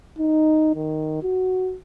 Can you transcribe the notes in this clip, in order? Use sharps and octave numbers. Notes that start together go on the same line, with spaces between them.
D#4
D#3
F#4